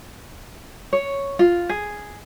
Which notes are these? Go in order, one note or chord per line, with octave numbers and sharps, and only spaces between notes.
C#5
F4
G#4